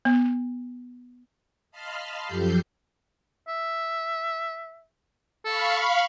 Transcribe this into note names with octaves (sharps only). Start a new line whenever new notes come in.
B3
D#5 F5 A5 B5 C6 F6
F#2 F3 G4 A4 G6 C7
E5
A4 F5 B5 C#6